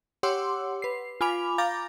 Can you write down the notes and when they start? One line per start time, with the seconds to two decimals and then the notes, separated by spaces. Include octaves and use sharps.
0.23 G4 C#5 F#5 C6 D6 E6
0.82 B4 C7
1.21 F4 G#5 B5 D6 F7
1.58 F5 A#5 D6 G6 A6 A#6